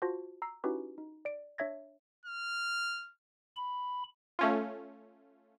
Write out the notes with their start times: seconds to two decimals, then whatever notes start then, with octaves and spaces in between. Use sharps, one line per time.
0.02 F4 F#4 C5 A5 A#6
0.42 A#5 E6 C7
0.64 C#4 D#4 E4 F#4 G4 B4
0.98 D#4
1.25 D5 D7
1.58 D4 C#5 E5 G#6 A#6
2.26 F6
3.57 B5
4.39 A3 C#4 F4